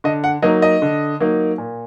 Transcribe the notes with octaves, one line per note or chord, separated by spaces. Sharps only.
D3 D#5
F#5
F#3 A#3 D#4 D#5
D#5
D3
F#3 A#3 D#4
A#2